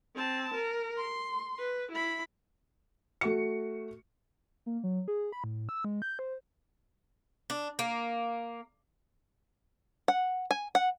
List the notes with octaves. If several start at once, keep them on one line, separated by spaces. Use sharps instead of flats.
C4 A5
A#4
C6
B4
E4 B5
A3 F#4 C#7
A#3
F#3
G#4
B5
A2
E6
G#3
G6
C5
D4
A#3
F#5
G#5
F#5